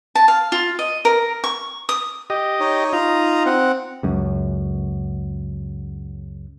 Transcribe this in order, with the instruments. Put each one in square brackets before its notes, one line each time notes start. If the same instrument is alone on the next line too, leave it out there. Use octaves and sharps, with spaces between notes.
[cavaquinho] A5
F5
F4
D#5
A#4
C#6
D#6
[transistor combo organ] G4 D#5
[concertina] D#4 C#5
[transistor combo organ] D#4 F4 [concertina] A#5 D#6
[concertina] C4 F#5
[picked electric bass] C#2 F#2